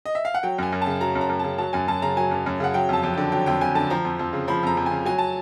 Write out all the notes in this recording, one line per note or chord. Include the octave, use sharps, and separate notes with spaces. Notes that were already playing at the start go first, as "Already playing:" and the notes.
D#5
E5
F5
F#5
F#3 G5
F#2 G#5
F#2
C#3 A5
F#3 A#5
F#2
A#5
F#2
C#3 A5
F#3 A5
F#2 G#5
F#2 A5
C#3 A#5
F#3 G#5
F#2
F#2
C#3 F#5
F#3 G5
F2 A5
F2
D3 G5
F#3 G5
F2 G5
F2 G#5
D3 A5
F3 A#5
F2
F2
C#3
F3 B5
F2 A#5
F2
G#5
C#3
F#3 G#5
A5